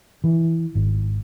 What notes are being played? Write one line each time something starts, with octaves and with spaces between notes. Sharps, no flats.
E3
G#1